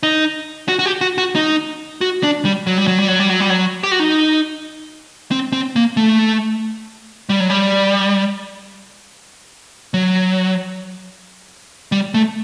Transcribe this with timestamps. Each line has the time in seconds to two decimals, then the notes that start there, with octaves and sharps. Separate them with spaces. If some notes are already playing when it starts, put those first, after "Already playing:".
0.03 D#4
0.68 F#4
0.79 F#4
0.86 G4
1.01 F#4
1.18 F#4
1.35 D#4
2.01 F#4
2.23 D4
2.45 G3
2.67 F#3
2.78 G3
2.87 F#3
2.99 G3
3.08 F#3
3.19 G3
3.29 F#3
3.40 G3
3.50 F#3
3.83 G4
3.91 F#4
3.99 D#4
5.31 C4
5.53 C4
5.76 A#3
5.97 A3
7.29 G3
7.40 F#3
7.50 G3
9.94 F#3
11.92 G3
12.14 A3